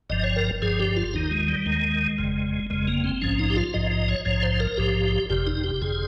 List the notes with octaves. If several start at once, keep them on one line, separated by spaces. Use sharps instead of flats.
G1 G2 F3 D#5
C#5
A#4
G1 G2 F3 G#4
G4
F4
D#2 D#3 D#4
G#3
G3
D#2 D#3 G#3
G1 F2 C#3
G1 F2 C#3 G#3
A#3
C4
A#1 G#2 F3 C#4
D#4
G4
F4
A#1 G#2 F3 D#5
D#5
C#5
A#1 G#2 F3 C#5
C5
A#4
A#1 G#2 F3 G4
G1 F2 C3 G4
D#4
G4
G1 F2 C3 G#4